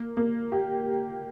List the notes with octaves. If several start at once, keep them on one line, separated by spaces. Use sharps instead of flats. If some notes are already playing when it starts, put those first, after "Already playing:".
Already playing: A#3
A#3
G4